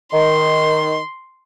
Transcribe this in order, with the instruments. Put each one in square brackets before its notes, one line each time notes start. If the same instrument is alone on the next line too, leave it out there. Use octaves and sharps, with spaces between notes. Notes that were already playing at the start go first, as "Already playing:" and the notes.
[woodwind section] D#3 [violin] C6